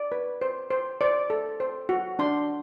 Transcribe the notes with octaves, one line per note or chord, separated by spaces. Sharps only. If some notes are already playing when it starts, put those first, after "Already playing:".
Already playing: D5
B4
C5
C5
C5 D5
A4
C5
F#4
D4 C6